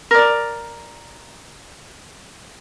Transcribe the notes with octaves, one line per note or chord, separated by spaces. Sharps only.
A#4 D5